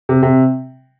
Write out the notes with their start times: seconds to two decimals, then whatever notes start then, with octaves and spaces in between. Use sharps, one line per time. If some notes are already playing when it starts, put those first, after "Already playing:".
0.09 C3
0.23 C3